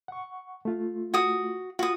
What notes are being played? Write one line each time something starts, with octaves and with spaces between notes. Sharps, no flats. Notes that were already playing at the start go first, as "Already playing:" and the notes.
F#5 C#6
A3 F4
F#4 D#6
F4 F#4 D#6